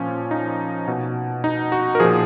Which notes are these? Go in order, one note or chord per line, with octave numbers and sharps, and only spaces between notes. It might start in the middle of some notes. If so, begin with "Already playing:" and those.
Already playing: A#2 F3 C#4
D#4
B2
D#4
F#4
A#4
A#2 F3 G#4